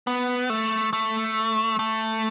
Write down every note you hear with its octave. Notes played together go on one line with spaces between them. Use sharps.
B3
A3
A3
A3